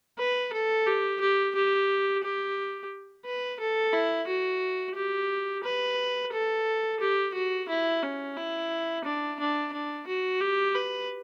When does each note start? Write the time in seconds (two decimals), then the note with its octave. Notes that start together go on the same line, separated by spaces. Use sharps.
0.18 B4
0.53 A4
0.87 G4
1.21 G4
1.55 G4
2.24 G4
3.25 B4
3.60 A4
3.93 E4
4.27 F#4
4.95 G4
5.64 B4
6.33 A4
7.00 G4
7.35 F#4
7.69 E4
8.03 C#4
8.37 E4
9.04 D4
9.39 D4
9.73 D4
10.07 F#4
10.41 G4
10.75 B4